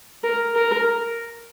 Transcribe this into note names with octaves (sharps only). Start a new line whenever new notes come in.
A#4
A#4